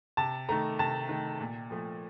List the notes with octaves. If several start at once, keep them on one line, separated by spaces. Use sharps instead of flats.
C3 A5
D#3 A3 A#5
C3 A5
D#3 A3
A#2
F3 A3